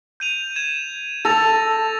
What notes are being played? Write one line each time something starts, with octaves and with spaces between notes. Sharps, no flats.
G6 D#7 F7
G#6 E7
A4 A6 A#6 F7